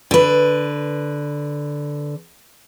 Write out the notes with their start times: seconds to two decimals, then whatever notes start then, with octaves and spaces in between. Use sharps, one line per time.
0.11 D3 B4